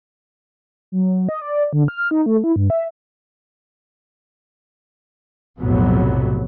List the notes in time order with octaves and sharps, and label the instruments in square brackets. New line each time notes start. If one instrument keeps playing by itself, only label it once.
[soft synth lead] F#3
D#5
D5
D3
F6
D#4
A3
E4
G2
E5
[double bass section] B1 F2 A2 C3 F#3 B3